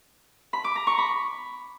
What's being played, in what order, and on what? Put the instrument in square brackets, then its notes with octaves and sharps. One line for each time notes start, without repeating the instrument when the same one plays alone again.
[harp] B5
D6
A#5
C#6
B5